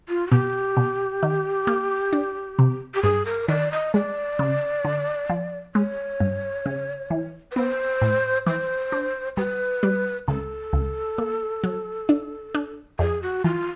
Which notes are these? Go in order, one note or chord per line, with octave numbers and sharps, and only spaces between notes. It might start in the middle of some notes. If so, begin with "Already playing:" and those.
F4
F#4
B2 G4
B2
D#3
A#3
D4
C3
G4
G2 G#4
A#4
D#3 D5
D#5
G#3 D5
C#3
D3
F3
G#3 C#5
G2
C#3
E3
B4
B3 C5
A2
E3 C5
D4
G3 B4
G3
C#2 A4
C#2
A#3
F#3
D4
D4
F2 G#4
F#4
E3 F4